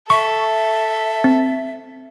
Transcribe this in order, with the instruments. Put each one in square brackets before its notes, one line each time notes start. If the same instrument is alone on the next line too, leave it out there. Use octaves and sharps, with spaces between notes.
[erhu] A4 [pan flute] E5 [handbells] C#6
[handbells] C4